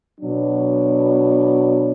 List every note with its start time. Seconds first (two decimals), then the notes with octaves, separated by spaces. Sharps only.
0.20 B2 F#3 D4